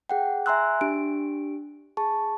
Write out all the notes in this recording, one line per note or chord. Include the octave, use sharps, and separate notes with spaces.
G#4 F#5 G5
E5 G#5 A#5 C6 E6 F#6
D4 G4 D7
G#4 A5 C#6